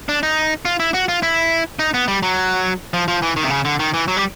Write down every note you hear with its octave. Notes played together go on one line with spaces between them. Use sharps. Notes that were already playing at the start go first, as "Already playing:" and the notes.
D4
D#4
F4
E4
F#4
F4
E4
D#4
B3
G3
F#3
F3
F3
E3
D#3
C3
C#3
D3
D#3
E3
F#3
G3